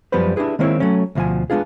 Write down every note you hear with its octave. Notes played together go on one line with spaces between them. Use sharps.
F#2 F3 G3 B3 B4 C5
D4 E4 G4 G#4 B4
D#3 G#3 A#3 C4 E4 C#5
F#3 A3 C#4
D2 B2 F3 F5 G#5
G#3 B3 D4 F4 G#4